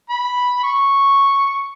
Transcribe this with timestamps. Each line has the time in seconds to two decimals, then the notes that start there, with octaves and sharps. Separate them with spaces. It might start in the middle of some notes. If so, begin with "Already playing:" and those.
0.09 B5
0.64 C#6